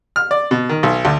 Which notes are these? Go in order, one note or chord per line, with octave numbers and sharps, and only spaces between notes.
F6
D5
B2
D#3
B1
D2